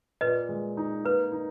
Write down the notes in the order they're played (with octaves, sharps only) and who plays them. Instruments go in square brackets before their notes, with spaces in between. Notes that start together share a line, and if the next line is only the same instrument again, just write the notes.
[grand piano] A#2 [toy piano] B4 D#5
[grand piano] G#3
D#4
[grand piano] A#3 [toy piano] B4
[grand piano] D#4